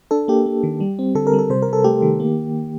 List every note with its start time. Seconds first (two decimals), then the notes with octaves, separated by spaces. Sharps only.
0.11 D4 A4
0.28 A#3 G4
0.46 A#3
0.63 D#3
0.80 G3
0.99 C4
1.15 D3 A4
1.27 A#4
1.33 G3
1.39 A4
1.50 C3 C5
1.62 A#4
1.68 C3 A4
1.84 A3 G4
2.02 D#3
2.20 A#3